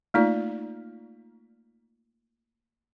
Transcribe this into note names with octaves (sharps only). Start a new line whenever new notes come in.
A3 A#3 D#4 F4 D5